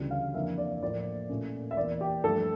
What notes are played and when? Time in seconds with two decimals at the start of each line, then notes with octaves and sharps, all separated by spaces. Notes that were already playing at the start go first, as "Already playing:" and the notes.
Already playing: D2 C#3 E3 G3 D4
0.11 F5
0.34 F2 E3 A#3 D4 E5
0.58 D5
0.82 A2 F3 A#3 D5
1.29 A#2 A3 C#4
1.71 E5
1.77 E2 E3 A#3 D5
2.01 G4
2.24 G2 F3 A3 A4